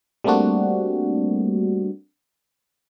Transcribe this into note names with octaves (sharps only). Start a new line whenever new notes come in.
G3 A3 A#3 C4 D4 F#4